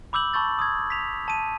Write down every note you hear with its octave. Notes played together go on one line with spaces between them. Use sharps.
B5 D6 E6 G6 F#7
A5 B5 C#6 E6 G6 A6
D#6 E6 G#6
B6 F7
A5 D#7